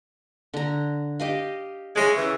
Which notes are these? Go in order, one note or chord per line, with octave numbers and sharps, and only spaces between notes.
D3 A#5
G4 D#5 F5
G#3 C#4 C#5 E5 B5
C#3 E3